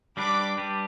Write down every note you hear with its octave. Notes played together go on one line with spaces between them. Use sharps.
G3 D4 G4 B4 B5 D6
G3 D4 G4 B4